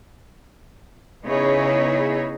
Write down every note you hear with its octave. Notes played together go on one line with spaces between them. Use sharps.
C#3 B3 D#4 E4 G#4 C#5